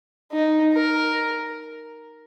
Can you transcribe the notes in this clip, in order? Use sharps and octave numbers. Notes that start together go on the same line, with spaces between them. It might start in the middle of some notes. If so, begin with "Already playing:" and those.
D#4
A#4